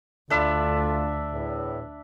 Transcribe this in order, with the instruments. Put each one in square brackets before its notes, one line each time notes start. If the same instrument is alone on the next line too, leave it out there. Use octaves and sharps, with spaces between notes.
[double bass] D2 [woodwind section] A3 F4 A4 [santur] D4 E5 B5
[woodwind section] E2 A2